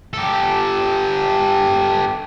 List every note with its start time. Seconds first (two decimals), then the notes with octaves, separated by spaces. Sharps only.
0.13 G4 A4